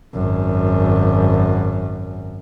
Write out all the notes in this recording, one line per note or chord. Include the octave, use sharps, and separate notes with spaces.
G#1 F#2